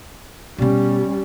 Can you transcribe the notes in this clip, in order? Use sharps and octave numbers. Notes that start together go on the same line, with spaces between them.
B2 G3 B3 C#4